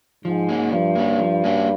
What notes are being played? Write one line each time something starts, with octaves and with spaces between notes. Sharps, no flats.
G#2 F3
A#3 C#4 F#4
G2 F3
A#3 C#4 F#4
F3
A#3 C#4 F#4